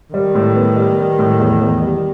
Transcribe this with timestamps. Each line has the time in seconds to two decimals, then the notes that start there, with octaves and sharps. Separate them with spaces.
0.13 D#3 G3
0.35 A2
0.55 B3
0.76 G3
0.97 G3
1.19 A2
1.39 E2
1.61 E2
1.82 G3